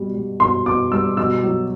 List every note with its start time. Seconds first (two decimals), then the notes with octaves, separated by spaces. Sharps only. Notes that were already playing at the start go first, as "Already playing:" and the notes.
Already playing: B2 G3
0.15 G3
0.40 B2 C6
0.66 B2 D6
0.92 G3 E6
1.17 B2 E6
1.43 F#3